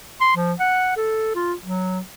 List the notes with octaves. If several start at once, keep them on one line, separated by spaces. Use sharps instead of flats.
C6
F3
F#5
A4
F4
F#3